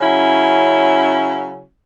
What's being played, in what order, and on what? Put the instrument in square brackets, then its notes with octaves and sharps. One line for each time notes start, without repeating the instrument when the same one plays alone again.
[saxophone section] C#3 F#3 C#4 E4